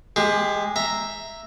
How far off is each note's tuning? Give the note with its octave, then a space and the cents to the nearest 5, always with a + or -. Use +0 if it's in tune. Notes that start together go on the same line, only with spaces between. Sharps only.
G#3 +0 G4 +25
E5 +0 A#5 +0